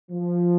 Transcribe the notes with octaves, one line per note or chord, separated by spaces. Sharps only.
F3